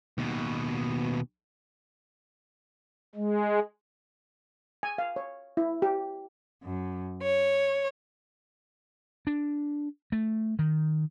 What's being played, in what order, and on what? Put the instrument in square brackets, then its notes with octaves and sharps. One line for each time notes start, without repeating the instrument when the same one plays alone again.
[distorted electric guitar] D#2 B2
[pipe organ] G#3
[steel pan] G#5
F5
C#5
E4
G4
[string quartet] F#2
C#5
[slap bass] D4
A3
D#3